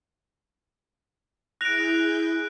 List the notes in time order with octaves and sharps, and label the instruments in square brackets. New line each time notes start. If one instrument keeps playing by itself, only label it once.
[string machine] E4 G#4 G6 [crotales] F#6 D7 [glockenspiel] A#6 F7